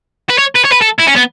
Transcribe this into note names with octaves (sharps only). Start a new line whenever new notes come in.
B4
C#5
B4
C#5
B4
A4
E4
C#4
B3